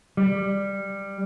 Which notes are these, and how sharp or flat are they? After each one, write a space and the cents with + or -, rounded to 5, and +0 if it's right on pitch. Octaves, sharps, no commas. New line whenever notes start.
G3 +10